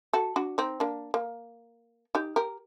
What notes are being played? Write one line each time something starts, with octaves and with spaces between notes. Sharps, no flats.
F#4 A4
D4 F#4
C4 D#4
A#3 D4
A#3
D#4 G4
G4 A#4